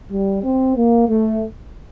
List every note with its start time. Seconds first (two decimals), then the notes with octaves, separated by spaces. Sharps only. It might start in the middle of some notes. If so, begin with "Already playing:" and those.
0.10 G3
0.43 C4
0.76 A#3
1.08 A3